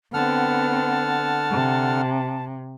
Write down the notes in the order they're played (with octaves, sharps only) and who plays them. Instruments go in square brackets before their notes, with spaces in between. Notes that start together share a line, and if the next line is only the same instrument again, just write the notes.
[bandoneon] D3 F#5 F6 [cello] B3 C4 [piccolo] A5
[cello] C3